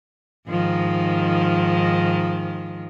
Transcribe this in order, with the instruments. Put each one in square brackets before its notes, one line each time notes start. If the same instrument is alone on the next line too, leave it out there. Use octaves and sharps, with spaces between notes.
[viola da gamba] G#2 D#3 F3